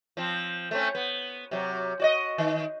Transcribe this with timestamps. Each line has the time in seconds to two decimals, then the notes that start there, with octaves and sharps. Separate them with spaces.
0.17 F3 C4
0.71 A3 C4 C#4
0.95 B3
1.51 C3 F#3
2.00 F#4 D5 D#5
2.38 D#3